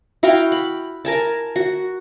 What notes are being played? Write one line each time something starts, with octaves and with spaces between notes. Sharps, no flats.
E4 F#4 F5 G5
B5
A#4 G#5 A5
F#4